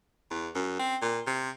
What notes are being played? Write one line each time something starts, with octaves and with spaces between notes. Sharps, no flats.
E2
F#2
C4
A#2
C3